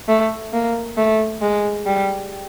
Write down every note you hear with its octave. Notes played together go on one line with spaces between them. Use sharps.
A3
A#3
A3
G#3
G3